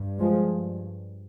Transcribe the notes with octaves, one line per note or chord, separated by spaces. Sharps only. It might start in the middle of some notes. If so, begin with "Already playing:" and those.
Already playing: G2
F3 G#3